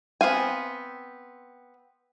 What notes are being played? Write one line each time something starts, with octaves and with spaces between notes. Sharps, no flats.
B3 C4 F5 G#5